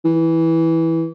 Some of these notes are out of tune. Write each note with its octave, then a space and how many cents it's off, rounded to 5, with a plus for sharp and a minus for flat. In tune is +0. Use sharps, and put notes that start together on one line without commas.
E3 -10